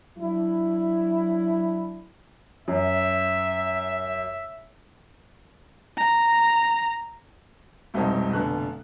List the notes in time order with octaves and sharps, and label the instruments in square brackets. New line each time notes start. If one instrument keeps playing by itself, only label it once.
[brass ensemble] F#3 D4 E4
[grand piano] F#2 [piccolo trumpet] E5
[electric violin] A#5
[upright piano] E1 C2 F2 D#4 C5
F1 B2 D3 F#6